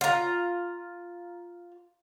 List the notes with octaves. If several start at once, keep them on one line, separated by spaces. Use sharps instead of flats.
F4 A#5